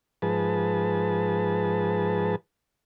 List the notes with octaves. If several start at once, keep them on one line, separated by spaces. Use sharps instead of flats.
G#2 F3 G#4 B4 A5